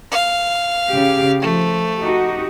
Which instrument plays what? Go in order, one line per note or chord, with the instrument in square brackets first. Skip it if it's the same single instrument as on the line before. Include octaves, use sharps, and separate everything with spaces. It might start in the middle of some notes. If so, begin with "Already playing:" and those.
[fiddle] F5
[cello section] C#3 G4
[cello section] F3 [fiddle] A3
[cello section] D#4 F#4 G4